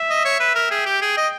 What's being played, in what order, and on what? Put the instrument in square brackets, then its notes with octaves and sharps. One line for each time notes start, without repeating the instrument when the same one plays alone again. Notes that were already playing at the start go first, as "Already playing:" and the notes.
Already playing: [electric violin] E5
[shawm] D#5
C#5
B4
A#4
[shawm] G#4 [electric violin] G5
[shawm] G4
G#4
D#5